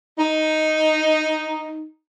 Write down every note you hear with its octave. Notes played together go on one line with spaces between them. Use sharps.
D#4